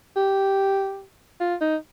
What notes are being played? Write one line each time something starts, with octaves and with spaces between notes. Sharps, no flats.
G4
F4
D#4